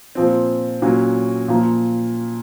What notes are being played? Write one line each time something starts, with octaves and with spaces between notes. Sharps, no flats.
A#2 F3 C4
A#2 F#3 C#4 F#4
A#2 F3 A#3 F4